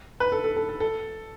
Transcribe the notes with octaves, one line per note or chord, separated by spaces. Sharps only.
B4
A4
A4
A4
A4
A4